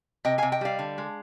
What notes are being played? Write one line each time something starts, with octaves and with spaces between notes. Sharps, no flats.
C3 D#5 G5
C3 F5 G#5
D#5 G5
G3 D5 F5
D3
G#3